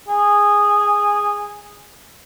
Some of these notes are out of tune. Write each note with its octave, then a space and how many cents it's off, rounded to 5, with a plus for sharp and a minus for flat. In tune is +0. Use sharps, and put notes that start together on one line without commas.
G#4 -10